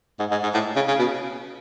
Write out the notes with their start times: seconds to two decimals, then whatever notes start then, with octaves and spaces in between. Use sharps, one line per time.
0.19 G#2
0.31 G#2
0.43 G#2
0.54 A2
0.76 C#3
0.88 C#3
0.99 B2